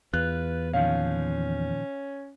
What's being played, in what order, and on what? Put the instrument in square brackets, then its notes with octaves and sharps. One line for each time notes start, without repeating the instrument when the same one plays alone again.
[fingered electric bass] E2 [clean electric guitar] F4 [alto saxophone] B4 [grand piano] F#6
[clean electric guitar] A#2 D#3 F3 [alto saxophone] C#4 [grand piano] F5